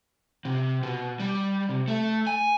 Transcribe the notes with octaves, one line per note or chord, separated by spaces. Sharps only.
C3
B2
G3
C3
A3
G#5